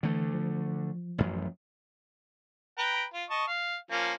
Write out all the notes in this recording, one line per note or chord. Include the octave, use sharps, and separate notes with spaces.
D3 E3 A3
F3
A1 F#2
B4 G5 A#5
F4
D#5 A5 C#6
F5
F3 A#3 C#4